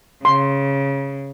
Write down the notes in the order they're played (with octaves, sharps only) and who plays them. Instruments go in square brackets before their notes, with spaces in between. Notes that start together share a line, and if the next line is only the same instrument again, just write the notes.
[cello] C#3 [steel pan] C6